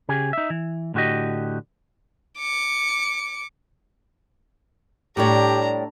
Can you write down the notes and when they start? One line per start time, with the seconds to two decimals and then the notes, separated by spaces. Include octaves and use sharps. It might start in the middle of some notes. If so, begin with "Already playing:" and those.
0.09 C#3 G4 G#4
0.33 D#4 E5
0.50 E3
0.94 A2 D3 F#4 G4 D#5
2.39 D6 C#7
5.17 A2 G3 D4 G4 C#5 A#5